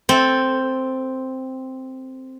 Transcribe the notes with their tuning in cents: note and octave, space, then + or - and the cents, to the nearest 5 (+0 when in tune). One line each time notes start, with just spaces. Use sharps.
C4 +0 A4 +0